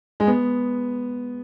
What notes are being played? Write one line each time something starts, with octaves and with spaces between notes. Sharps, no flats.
G#3
B3